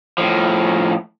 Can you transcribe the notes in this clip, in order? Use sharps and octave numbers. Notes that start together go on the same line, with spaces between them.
A2 F3